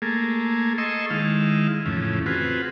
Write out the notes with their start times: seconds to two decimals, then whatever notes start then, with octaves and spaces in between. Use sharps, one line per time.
0.02 A3 A#3 G#4
0.78 G#4 A4 D#5 C6 C#6 E6
1.10 D#3 G#3 E4 F5
1.86 F2 A2 C#3 E3
2.26 C4 F4 F#4 G#4 B4